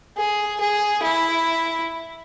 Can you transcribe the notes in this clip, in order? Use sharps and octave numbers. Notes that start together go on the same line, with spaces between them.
G#4
G#4
E4